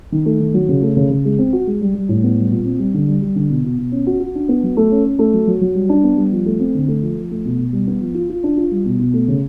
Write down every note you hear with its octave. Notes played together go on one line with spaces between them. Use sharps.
D#3
A3
D#3
F#3
C#3
A3
C#3
C#3
G#3
C4
F#4
G#3
G3
G3
A2
B3
G3
A#2
C4
G3
D3
G3
G3
D3
B2
B2
B2
C#4
F#4
F#4
D4
B3
F#3
A3
C#4
C#4
A3
F#3
F#3
F#3
G3
D4
B3
G3
F3
A3
C4
D3
A3
F3
F3
A3
B2
B2
G3
B3
F3
F4
F4
D4
F4
G3
B2
B2
A3
C#3